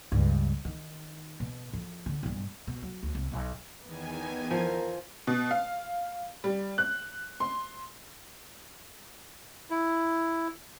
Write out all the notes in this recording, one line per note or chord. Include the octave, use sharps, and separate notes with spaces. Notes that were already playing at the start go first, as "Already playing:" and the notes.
C#2 G2
D#3
B2
F2
D3
B1 G2
B2
F#3
D2
C2
B1
E2 D#3 B3 G#5
F3 A#4
B2
F5
G3
F#6
C6
E4